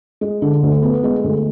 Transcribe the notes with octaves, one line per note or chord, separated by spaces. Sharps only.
G#3
D3
D2
B3
G#3
D2